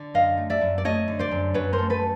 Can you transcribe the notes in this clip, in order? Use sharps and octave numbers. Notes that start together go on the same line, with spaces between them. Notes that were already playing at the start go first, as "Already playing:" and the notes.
Already playing: D3
F#2 D#5 F5
A3
D5 E5
F#2
D5
A3 C#5 D#5
D3
C5 D5
F#2
F#2 B4 C#5
A#4 C5
A3
A4 B4